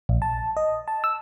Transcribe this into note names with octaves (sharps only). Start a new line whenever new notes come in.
A#1
A5
D#5
A5
E6